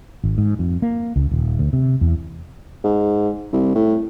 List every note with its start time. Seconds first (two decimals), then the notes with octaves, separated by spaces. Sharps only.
0.24 G#1
0.38 G#2
0.59 F2
0.82 A#3
1.16 C#2
1.31 D#1
1.59 D2
1.73 C3
2.01 E2
2.84 G#2
3.52 C2
3.75 A2